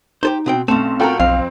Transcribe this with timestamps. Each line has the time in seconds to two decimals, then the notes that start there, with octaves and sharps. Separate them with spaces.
0.23 D#4 G4 A4 C5
0.46 B2 C4 G5
0.68 B1 A3 C4 C#4 C6 E7
1.00 A2 F4 F#4 A4 A#4 G5
1.20 B1 F2 C4 F5